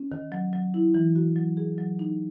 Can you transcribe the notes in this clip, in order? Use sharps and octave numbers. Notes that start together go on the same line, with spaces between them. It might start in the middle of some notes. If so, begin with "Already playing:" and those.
Already playing: C#4
D#3
F#3
F#3
E4
E3
F#4
F#3
G#4
F#3
D#4